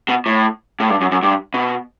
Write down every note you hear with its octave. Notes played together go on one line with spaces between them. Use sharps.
B2
A2
A2
G2
F#2
F#2
G2
B2